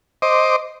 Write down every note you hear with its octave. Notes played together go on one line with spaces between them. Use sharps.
C5 D#5 D6